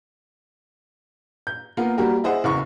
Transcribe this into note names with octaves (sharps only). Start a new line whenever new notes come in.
G6
A#3 B3 F4 A#4
G3 A#3 F#4 G4 A#4
E4 G#4 C5 D#5 F#5
F#1 E2 C#6